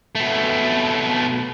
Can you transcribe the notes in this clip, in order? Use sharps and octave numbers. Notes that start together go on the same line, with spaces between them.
B2 A3